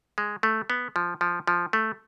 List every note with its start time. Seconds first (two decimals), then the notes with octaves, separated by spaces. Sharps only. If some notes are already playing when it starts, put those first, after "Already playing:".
0.18 G#3
0.43 A3
0.70 B3
0.96 F3
1.21 F3
1.47 F3
1.73 A3